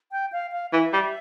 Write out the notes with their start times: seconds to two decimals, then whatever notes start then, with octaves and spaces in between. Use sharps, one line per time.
0.12 G5
0.32 F5
0.52 F5
0.73 E3 E5
0.93 G3